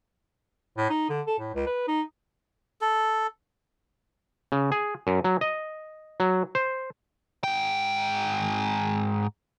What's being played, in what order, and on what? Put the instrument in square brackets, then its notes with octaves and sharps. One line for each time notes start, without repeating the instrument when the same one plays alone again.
[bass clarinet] A2
D#4
D3
A4
A2
C#2
B4
D#4
[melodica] A4
[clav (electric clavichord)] C#3
G#4
F#2
F#3
D#5
F#3
C5
[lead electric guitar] G#2 G5